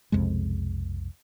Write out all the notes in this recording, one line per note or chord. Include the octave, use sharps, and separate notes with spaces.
B1 F2 C3 G#3